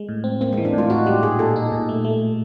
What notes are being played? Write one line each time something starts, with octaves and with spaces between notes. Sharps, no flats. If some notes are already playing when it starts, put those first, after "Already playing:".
Already playing: G#3
A2
C4
A#3 C4
G#3
E3
D4
A2 F4
D#4 F#4
G3 G4
A#2 G#4
A#2 A4
D#4
A#2
A3
A3